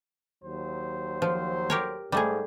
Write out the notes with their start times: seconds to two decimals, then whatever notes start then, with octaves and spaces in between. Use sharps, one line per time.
0.44 D#2 F#3 C5
1.22 F3
1.70 G4 A#4 C#5
2.12 G#2 G3 A3 G#4